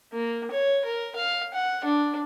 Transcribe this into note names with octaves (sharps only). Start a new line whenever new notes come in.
A#3
C#5
A#4
F5
F#5
D4